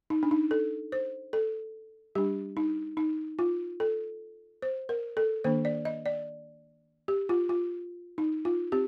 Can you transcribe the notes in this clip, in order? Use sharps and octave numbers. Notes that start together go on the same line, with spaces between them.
D#4
D4
D#4
A4
C5
A4
G3 D4 G4
D#4
D#4
F4
A4
C5
A#4
A4
D#3 A#3 D4 C5
D5
D#5
D5
G4
F4
F4
D#4
F4
C4 G4